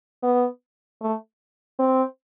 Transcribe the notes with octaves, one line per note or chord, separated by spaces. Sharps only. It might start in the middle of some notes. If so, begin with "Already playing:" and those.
B3
A3
C4